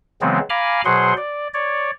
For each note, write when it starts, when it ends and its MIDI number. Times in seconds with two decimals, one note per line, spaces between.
0.21 0.39 49
0.21 0.39 52
0.21 0.39 54
0.21 0.39 56
0.21 0.39 59
0.21 0.39 60
0.50 0.81 77
0.50 0.81 80
0.50 0.81 82
0.50 0.81 83
0.50 0.81 86
0.50 0.81 89
0.85 1.13 47
0.85 1.13 54
0.85 1.13 68
0.85 1.13 72
0.85 1.13 78
0.85 1.13 84
1.17 1.48 74
1.54 1.91 73
1.54 1.91 74